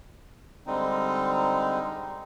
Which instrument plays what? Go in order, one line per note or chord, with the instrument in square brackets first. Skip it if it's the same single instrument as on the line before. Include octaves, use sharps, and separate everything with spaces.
[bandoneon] D3 G3 G#3 C4 D#4